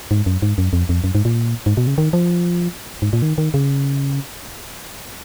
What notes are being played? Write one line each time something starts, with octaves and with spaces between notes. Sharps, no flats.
G#2
F#2
G#2
F#2
F2
F2
F#2
G#2
A#2
G#2
B2
C#3
D#3
F3
G#2
A#2
D#3
D#3
C#3